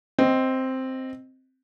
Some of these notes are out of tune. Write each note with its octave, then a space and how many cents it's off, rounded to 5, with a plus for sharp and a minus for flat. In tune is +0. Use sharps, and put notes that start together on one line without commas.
C4 +0 D#5 +0